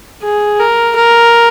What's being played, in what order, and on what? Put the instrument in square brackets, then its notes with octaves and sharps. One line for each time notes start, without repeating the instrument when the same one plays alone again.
[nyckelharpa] G#4
A#4
A#4